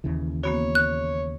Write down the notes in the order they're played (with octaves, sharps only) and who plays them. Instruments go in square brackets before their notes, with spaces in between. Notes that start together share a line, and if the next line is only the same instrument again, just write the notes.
[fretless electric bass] D#2 C#3 E3
[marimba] A#3 B3 F#4 [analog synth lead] C#5
[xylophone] F#6